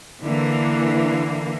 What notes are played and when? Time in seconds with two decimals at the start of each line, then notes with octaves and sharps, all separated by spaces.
0.22 D3 E3 A#3